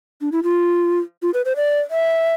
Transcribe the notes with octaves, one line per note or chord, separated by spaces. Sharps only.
D4
E4
F4
F4
B4
C5
D5
E5